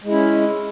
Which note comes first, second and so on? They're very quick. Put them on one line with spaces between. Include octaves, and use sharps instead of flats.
G#3 E4 C#4